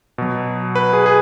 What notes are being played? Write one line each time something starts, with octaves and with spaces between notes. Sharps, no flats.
B2 F#3
B4
G#4
G#4